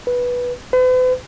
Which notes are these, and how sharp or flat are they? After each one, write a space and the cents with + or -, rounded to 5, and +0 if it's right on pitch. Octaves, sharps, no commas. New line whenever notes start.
B4 -10
B4 +45